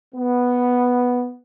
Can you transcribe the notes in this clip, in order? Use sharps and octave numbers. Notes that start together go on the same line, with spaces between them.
B3